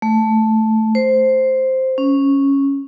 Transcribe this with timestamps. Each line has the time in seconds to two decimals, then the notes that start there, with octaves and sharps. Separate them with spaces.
0.02 A3
0.95 C5
1.98 C#4